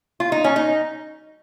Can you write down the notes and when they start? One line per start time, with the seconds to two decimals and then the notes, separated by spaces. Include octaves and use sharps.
0.20 F4
0.32 D#4
0.44 C#4
0.56 D#4